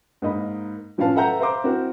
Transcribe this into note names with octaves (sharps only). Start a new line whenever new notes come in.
G#2 A#3 D#4 D#5 B5
A2 F3 C#4 B4 F5 A5
A4 B4 E5 F#5 A#5 G6
C5 E5 F5 A#5 C6 D6
C4 E4 F#4 A#4